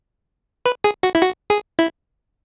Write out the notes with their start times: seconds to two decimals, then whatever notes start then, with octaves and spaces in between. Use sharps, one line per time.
0.66 B4
0.84 G#4
1.03 F#4
1.15 E4
1.22 F#4
1.50 G#4
1.79 E4